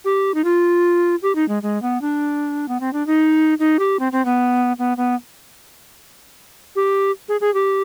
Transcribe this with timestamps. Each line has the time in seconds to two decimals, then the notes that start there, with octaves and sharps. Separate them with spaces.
0.05 G4
0.34 D#4
0.44 F4
1.23 G4
1.35 D#4
1.49 G#3
1.63 G#3
1.82 B3
2.01 D4
2.68 B3
2.80 C4
2.93 D4
3.07 D#4
3.59 D#4
3.79 G4
4.00 C4
4.12 C4
4.25 B3
4.79 B3
4.97 B3
6.76 G4
7.29 G#4
7.41 G#4
7.54 G4